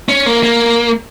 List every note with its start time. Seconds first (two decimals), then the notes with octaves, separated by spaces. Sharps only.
0.09 C#4
0.26 A#3
0.43 A#3